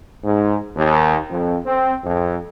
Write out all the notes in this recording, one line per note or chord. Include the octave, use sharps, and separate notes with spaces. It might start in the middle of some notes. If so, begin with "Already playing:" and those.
G#2
D#2
F2
C4
F2